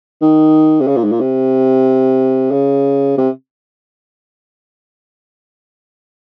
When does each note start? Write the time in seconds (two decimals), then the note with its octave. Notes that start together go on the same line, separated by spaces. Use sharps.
0.22 D#3
0.81 C3
0.87 C#3
0.96 A#2
1.04 G#2
1.12 A#2
1.20 C3
2.51 C#3
3.17 C3